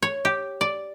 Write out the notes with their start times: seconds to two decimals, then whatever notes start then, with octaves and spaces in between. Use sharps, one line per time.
0.03 C#5
0.25 G4
0.61 D5